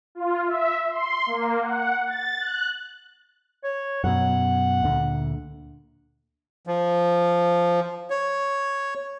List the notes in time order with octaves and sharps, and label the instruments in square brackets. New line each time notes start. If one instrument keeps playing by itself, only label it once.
[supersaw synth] F4
E5
C6
A#3
F#5
A6
F#6
[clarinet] C#5
[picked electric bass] F#2 B2 [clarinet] F#5
[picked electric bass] D2 A#2 D3
[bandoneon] F3
C#5